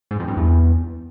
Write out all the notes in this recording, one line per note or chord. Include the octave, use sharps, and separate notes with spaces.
G#2
F2
G2
E2